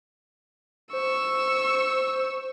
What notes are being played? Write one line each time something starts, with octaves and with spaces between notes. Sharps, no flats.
C5 C#6 E6